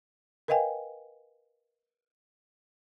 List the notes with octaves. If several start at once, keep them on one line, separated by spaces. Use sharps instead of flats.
A#4 B4 D#5 F5 G5 G#5